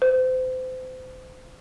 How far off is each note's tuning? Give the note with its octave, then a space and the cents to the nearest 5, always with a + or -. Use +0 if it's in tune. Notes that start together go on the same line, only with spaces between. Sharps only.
C5 -30